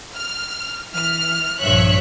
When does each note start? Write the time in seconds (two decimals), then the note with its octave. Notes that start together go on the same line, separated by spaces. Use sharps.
0.16 F6
0.93 E3 F6
1.61 A#1 G2 F3 C#5 E5 F#6